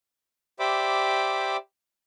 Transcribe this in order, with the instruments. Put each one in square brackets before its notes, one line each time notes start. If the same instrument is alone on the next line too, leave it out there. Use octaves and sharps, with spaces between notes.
[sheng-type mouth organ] G4 C5 D5 E5 B5 D6